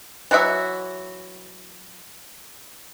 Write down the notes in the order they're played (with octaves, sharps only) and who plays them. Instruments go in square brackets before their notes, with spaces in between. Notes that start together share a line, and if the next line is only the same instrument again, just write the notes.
[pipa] E3 F#3 F#4 E5